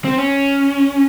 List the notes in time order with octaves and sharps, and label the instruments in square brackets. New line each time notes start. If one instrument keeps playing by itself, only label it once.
[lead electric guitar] C4
C#4